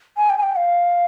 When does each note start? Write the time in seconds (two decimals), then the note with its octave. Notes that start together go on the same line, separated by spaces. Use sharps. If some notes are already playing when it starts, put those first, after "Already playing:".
0.17 G#5
0.30 G5
0.38 G#5
0.43 G5
0.56 F5